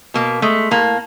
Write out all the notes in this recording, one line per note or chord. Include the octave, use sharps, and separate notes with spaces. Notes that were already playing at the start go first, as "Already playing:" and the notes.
B2 A#3
G#3 A3
A2 A#3